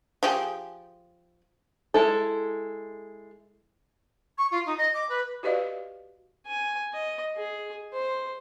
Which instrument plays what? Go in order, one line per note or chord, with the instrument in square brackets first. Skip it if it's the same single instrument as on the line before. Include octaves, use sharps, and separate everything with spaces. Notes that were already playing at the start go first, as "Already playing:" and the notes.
[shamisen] F3 G4 G#4
[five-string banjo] G#3 E4 A4
[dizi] C#6
F4
D#4
D#5
D6
B4
[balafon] F#4 G4 B4 D5 D#5 F5
[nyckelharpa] G#5
D#5
G#4
C5